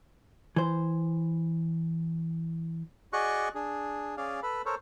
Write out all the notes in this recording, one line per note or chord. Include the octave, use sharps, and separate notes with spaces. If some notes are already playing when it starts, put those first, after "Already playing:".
E3 C5
F#4 G#4 D5 D#5 C#6 F#6
D4 G#4
C#4 G#4 D5 F5
A4 B4 B5
A4 A#4 C5 C#5